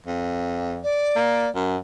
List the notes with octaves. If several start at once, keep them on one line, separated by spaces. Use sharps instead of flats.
F2
D5
A#3
F#2